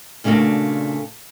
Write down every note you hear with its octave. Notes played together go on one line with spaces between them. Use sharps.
A#2 C#3 A3 D4 F#4